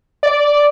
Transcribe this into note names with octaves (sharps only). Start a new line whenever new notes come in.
D5